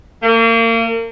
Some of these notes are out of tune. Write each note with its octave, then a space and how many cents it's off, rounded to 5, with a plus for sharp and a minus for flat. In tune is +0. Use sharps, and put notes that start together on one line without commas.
A#3 -35